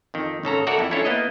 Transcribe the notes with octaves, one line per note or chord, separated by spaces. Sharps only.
F2 D#3
G#1 C#3 A4 A#5
F#4 A4 A#4 D5 E5 F#5
F2 E4
C#4 D4 E4 F4 A4 C#5
A#3 B3 E4 D#5